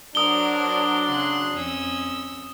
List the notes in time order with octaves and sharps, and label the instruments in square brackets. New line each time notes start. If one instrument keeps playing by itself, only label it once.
[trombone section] F#3 D4 [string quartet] A#4 C5 [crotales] D#6 G7
[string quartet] C#3 C6 F#6
F2 C#4 E6